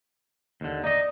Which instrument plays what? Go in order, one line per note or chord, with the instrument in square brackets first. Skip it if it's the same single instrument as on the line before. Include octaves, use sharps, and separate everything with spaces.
[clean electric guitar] D#2 D3
[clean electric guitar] D#4 D#5 [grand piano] D5